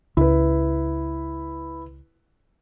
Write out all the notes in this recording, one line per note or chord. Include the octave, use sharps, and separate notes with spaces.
C#2 E4 B4